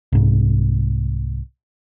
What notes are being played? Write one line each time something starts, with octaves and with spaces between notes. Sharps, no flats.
C2 G#2